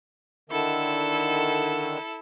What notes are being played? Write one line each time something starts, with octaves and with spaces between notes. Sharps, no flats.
D3 D#3 E4 A4